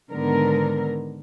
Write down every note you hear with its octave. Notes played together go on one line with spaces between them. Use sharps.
G#2 D3 D#3 B3 A#4